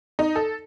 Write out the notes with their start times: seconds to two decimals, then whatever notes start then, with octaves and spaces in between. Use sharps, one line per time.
0.19 D#4
0.36 A4